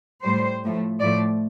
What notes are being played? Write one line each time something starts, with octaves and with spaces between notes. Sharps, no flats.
A2 G3 C5
A2 F3 A3
A2 F3 A3 D5